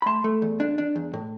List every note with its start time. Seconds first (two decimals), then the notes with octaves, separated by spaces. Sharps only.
0.02 B5
0.06 A3 A5 C6
0.24 A3
0.42 E2
0.60 D4
0.78 D4
0.96 E2
1.13 A2